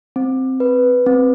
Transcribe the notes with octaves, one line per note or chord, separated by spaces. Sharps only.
C4
B4
C4